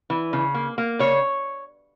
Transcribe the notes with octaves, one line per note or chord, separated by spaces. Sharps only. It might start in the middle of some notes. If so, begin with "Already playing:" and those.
E3
C#3
A#3
A#3
C#3 C#5